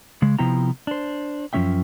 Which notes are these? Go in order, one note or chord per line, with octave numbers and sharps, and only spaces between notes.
C#3 G#3
C3 F3 B3 E4 G5 A#5
D4 C5
F#2 F3 G3 C#4 E5 G5